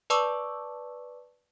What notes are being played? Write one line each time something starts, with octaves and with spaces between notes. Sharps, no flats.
B4 D5 A5 C#6 D6 E6